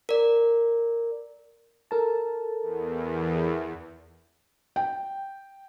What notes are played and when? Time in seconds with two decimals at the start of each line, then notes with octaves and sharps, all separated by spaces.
0.09 A#4 D5
1.91 A4 A#4 A5
2.62 E2
4.76 G5